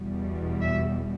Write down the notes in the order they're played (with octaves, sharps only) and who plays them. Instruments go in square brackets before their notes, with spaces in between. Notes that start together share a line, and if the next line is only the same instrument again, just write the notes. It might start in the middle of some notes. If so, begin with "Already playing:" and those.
Already playing: [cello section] E2 B2 G3
E5